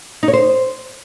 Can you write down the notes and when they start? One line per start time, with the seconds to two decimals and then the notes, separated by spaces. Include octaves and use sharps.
0.23 D#4
0.28 C#5
0.33 C5